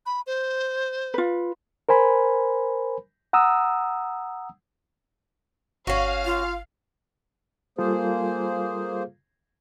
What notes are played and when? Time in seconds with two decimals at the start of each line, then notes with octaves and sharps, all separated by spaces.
0.06 B5
0.27 C5
1.14 F4 B4
1.89 A#4 C5 G#5 B5
3.33 F#5 A#5 D#6 E6
5.87 G1 C#4 F#4 F5
6.25 F4
7.78 G3 A#3 F4 G#4 A4 C5